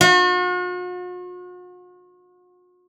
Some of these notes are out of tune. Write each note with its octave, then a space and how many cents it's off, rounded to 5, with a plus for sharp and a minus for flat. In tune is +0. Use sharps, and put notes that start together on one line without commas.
F#4 -45